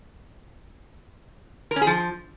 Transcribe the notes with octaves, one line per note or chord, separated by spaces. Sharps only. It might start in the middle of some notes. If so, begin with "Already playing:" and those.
A#4
C#4
G#4
F3